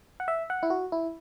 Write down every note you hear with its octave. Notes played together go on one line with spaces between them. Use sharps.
F#5
E5
F#5
E4
F#4
E4